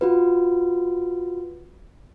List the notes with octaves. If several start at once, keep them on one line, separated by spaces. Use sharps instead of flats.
F4 F#4 B4